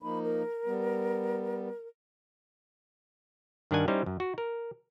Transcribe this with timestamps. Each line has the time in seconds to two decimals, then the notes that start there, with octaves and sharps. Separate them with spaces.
0.02 F3 A#3 D#4 B5
0.24 A#4
0.66 G3 B3
3.71 G2 D#3 D4 A#4 F#5 G#5
3.88 G3 C#4 D#4 E4 C5
4.06 F#2
4.20 F#4
4.38 A#4